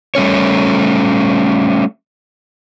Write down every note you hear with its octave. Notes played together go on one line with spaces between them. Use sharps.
G3 A3 C#4 C#5